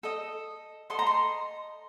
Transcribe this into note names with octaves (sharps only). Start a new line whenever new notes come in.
A4 D#5
A4 C5 D#5 C6
A#5
C6